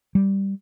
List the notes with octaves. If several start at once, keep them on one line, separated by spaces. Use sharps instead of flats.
G3